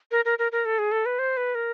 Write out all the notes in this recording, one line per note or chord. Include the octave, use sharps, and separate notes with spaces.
A#4
A#4
A#4
A#4
A4
G#4
A4
B4
C5
B4
A#4